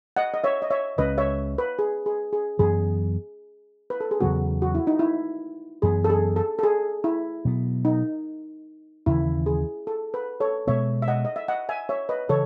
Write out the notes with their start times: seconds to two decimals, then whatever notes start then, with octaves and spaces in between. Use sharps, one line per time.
0.16 D#5 F#5
0.34 D#5
0.44 C#5 E5
0.62 D#5
0.70 C#5 E5
0.98 C#2 C#3 G#3 C#4 B4 D#5
1.18 C#5 E5
1.58 B4
1.79 G#4
2.06 G#4
2.33 G#4
2.59 F#2 E3 B3 G#4
3.90 B4
4.00 A4
4.11 G#4
4.21 E2 C#3 F#3 B3 F#4
4.62 F#4
4.75 E4
4.87 D#4
4.99 E4
5.82 F#2 E3 B3 G#4
6.04 A4
6.10 G#4
6.36 A4
6.59 A4
6.63 G#4
7.04 E4
7.45 B2 F#3 B3
7.85 D#4
9.06 D#2 C#3 E3 E4
9.46 G#4
9.87 A4
10.14 B4
10.40 A4 C#5
10.67 B2 G#3 B3 C#5 E5
11.02 E5
11.08 D#5 F#5
11.25 D#5
11.36 E5
11.48 D#5 F#5
11.69 E5 G#5
11.89 C#5 E5
12.09 B4 D#5
12.29 C#3 E3 A4 C#5